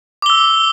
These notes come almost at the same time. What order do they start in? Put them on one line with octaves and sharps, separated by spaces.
D6 G7 E6